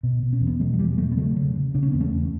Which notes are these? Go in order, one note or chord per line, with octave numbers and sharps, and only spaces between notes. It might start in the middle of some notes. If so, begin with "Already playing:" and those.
B2
B2
C#4
E2
B3
B2 F#3 A3
F#3
E2 E3 G3
B2 F#3 A3
B3
C#3 F#3 A3
C#3
C#3
C#3 D4
C#4
E2 B3
A3 C#4
E2